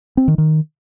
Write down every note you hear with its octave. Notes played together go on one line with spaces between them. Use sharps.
C4
D#3
D#3